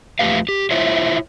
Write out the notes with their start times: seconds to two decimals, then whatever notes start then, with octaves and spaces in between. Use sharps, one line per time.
0.19 E2 F3 A3 G4 B4 F5
0.49 G4
0.70 E4 F4 C5 C#5 E5